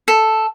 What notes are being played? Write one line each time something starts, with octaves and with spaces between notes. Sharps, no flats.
A4